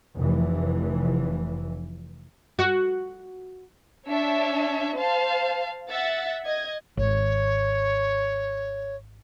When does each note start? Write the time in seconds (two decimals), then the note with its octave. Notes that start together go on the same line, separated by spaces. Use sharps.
0.17 F1 E3
2.59 F#4
4.07 D4 C#5 E5
4.97 C5 F5 A5
5.91 E5 F#5 A6
6.44 D#5 G#6
6.97 G#1 C#5